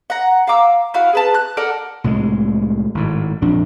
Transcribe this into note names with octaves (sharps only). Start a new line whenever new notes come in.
F#5 A#5
F5 A#5 D6 E6
E4 F#4 F5
G#4 B4 A5
F#6
A4 A#4 D5 F#5
C2 A2 C3 G#3
G#1 A2
A#1 F2 D4